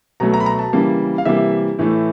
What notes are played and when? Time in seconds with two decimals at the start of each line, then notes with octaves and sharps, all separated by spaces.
0.20 B2 F#3 A3 A#5
0.34 A#5
0.40 B5
0.46 A#5
0.59 A5
0.73 C#3 E3 G3 A#3
1.18 F5
1.25 C3 E3 G3 A#3 E5
1.79 A2 E3 A3